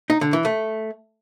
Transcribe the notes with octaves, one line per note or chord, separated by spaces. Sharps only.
D#4
D3
E3
A3